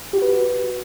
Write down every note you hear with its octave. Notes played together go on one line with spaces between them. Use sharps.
F#4 G4 B4